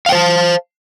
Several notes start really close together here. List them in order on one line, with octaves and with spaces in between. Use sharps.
F5 G5 C5 A5